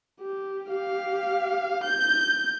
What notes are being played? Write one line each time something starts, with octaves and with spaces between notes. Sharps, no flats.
G4
G4 F5
G6